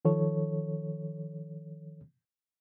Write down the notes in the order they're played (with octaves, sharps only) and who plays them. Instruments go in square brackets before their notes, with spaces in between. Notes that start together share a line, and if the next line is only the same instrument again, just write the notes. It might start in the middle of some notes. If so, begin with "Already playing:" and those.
[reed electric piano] D#3 F3 A4 C#5